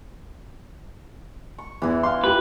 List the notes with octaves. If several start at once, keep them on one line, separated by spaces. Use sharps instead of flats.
C#6
E2 E3 E4
F5 C6
F4 G4 B4